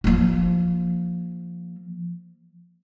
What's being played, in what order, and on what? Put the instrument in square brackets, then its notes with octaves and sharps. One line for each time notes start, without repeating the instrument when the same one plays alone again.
[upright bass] F3 A#3